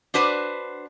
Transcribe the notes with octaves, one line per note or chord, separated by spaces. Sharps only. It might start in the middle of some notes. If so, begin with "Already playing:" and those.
D4 F#4 B4 C5